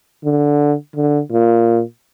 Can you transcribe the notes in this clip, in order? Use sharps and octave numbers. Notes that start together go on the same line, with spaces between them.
D3
D3
A#2